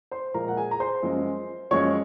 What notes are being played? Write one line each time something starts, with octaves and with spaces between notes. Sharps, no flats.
C5 C6
A#2 F3 G#3 A#4 A#5
F#5
G#4 G#5
A#5
C5 C6
F#2 F3 G#3
F#2 F3 G#3 C#5 C#6